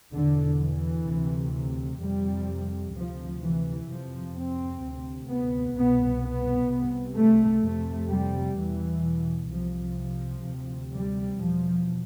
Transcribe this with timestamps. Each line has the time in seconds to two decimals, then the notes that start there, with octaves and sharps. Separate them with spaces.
0.13 E2 B2 D3
0.60 E3
1.07 D2 C3
2.00 F2 C3 G3
2.94 D2 C3 F3
3.42 E3
3.88 F2 C3 F3
4.35 C4
4.83 D2 C3
5.29 B3
5.76 C2 B2 B3
6.22 B3
6.70 C2 C3
7.16 A3
7.64 F2 C3 A3
8.10 G3
8.57 E2 B2 E3
9.50 C2 C3 F3
9.98 F3
10.45 D2 C3
10.92 G3
11.38 E2 B2 F3